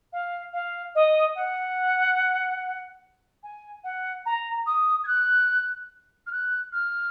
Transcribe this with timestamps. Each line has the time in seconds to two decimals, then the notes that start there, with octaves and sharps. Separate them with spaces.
0.12 F5
0.53 F5
0.95 D#5
1.35 F#5
3.43 G#5
3.83 F#5
4.25 A#5
4.66 D#6
5.04 G#6
5.07 F#6
6.26 F6
6.32 F#6
6.72 F6